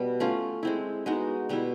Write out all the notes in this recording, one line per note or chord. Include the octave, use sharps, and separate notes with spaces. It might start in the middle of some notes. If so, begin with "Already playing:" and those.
Already playing: B2 G3 B3
A3 C#4 F4
G#3 C4 E4
G#3 B3 D#4 F#4
B2 G3 B3 E4